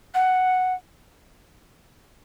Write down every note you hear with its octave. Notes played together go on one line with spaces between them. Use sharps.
F#5